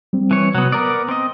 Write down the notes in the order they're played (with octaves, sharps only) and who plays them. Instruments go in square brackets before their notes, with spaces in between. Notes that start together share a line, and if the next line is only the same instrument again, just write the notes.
[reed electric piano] G3 C4
[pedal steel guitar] E3 C#5
[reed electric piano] C3 [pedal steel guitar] F#3 B3
[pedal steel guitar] B3 A#4 D5 [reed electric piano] A#5 D#6
[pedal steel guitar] C4 D#5